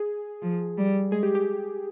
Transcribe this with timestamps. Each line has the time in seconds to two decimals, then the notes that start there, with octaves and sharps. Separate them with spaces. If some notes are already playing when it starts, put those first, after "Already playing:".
Already playing: G#4
0.42 F3
0.78 G3
1.11 G#3 G#4
1.23 G4
1.35 G4